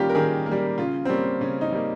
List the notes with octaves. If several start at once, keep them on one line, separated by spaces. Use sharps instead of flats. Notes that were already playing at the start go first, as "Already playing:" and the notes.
Already playing: D#3 G3 A#3 C#4 F4 G4
A#4
D#3 G#4
A#3
G3
C#3 F4
C4
G3 A#3 C#4
C#3 C#4
D#4
G3 A#3